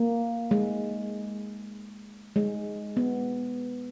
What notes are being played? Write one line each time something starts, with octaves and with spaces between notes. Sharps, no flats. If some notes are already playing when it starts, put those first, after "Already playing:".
Already playing: A#3
G#3
G#3
B3